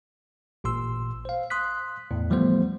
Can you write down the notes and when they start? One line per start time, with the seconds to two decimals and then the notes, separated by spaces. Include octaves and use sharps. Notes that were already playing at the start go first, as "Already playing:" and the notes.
0.64 A1 A#2 C6 E6
1.25 C5 F5
1.50 C6 D#6 F#6 B6
2.11 E2 A2
2.30 E3 F3 G3 A3 B3 C5